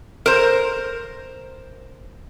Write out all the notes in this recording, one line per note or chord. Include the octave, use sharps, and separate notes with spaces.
A#4 C5